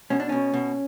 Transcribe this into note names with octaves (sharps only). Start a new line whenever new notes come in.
B2 C#4
D4
B2 C#4
B2